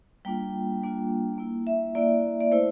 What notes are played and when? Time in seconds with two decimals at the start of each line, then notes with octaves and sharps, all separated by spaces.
0.25 G3 A#3 D4 F4 G5
0.81 G3 A#3 D4 F4
1.38 A#3 E4
1.67 E5
1.95 A#3 E4 D5
2.40 D5
2.52 A3 E4 C5